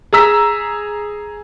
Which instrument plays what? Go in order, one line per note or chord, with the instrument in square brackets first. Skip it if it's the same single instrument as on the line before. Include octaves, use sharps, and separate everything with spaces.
[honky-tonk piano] G#4 A#5 E6 B6